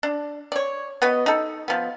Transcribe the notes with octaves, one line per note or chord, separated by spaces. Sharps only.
D4
C#5 D5
B3 F#4 B4 D#5
D#4 A4
F3 B3